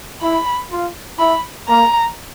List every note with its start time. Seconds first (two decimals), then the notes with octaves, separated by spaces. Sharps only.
0.21 E4 B5
0.71 F4
1.19 E4 B5
1.68 A#3 A#5